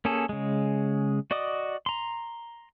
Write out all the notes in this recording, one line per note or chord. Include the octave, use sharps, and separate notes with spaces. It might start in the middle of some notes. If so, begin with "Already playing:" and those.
A#3 C#4 G#4 A4
C#3 G#3
F#4 D5 D#5 D6 D#6
A#5 C6